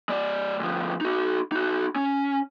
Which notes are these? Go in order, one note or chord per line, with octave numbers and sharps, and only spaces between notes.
G#3 D5
D2 F3
D#4 F#4
D#4 F#4
C#4